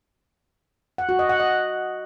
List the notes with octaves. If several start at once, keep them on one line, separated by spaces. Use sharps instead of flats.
F#5
F#4
D#5
F#5
D#5